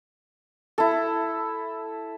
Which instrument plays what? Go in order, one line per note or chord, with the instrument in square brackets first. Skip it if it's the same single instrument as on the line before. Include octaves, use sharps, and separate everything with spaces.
[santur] E4 A4